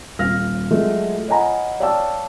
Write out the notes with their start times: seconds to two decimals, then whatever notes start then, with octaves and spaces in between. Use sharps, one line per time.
0.19 D#1 F5 F6 A#6
0.71 F#3 G#3 A3 F4 F#4 A4
1.28 C#5 D#5 F#5 G#5 A#5 B5
1.80 C#5 D5 F5 G5 A5 E6